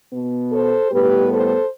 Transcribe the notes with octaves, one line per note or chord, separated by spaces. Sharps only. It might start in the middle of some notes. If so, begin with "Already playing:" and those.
B2 B3
A4 C5
A2 G3 B3 G4 B4
A4 C5